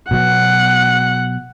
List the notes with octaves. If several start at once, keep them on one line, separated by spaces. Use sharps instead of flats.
B2 F#3 B3 F#5